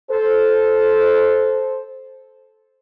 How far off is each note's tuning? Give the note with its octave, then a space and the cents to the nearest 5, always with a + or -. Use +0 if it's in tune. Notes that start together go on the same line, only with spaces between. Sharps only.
A4 -15 C5 +0